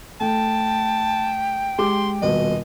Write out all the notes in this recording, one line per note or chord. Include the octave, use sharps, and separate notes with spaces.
A3 G5 A5
G#3 G4 C6 D6
D#1 B2 D#5